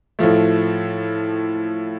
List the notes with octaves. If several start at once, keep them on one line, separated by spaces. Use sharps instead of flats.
A2 F3 A3